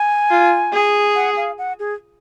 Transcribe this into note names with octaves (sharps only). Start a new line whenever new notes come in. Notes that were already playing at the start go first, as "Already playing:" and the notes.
Already playing: G#5
F4
G#4
F#5
F5
F#5
G#4